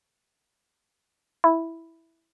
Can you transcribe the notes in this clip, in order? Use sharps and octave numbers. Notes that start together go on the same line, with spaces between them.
E4